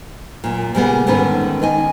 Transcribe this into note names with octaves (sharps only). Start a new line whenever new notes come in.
F#2 A#2
A#2 C#3 G3 G#3 A#3 B3
G#2 D3 D#3 B3 C#4 B4
D#3 D#5 G#5